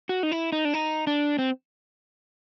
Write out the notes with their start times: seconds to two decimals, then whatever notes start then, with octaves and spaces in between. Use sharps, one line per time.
0.09 F#4
0.23 D#4
0.32 E4
0.52 D#4
0.65 D4
0.74 D#4
1.07 D4
1.38 C4